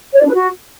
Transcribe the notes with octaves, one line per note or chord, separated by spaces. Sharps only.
C#5
D5
D4
B4
F#4